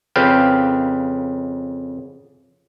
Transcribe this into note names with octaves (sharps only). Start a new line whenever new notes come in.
F2 C#3 B4 F5 G5